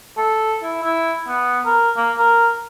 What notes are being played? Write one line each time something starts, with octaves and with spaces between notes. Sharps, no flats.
A4
E4
E4
B3
A#4
A#3
A#4